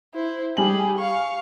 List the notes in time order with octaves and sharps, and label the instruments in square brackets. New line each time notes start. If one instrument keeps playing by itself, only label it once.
[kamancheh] E4 C5
[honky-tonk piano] G3 G#5 F#7 [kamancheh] G4 G#4
[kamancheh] F5 C#6